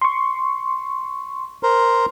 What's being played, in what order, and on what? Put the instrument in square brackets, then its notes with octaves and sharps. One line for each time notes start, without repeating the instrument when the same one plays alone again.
[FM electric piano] C6 C#6
[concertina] A#4 C5